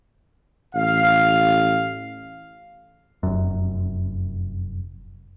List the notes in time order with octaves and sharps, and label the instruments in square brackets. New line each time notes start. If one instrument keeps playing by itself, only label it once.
[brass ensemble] A1 F5
[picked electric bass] F1 F#2